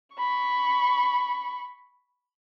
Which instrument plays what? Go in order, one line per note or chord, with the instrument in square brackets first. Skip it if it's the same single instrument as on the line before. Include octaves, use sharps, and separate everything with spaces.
[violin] B5 C#6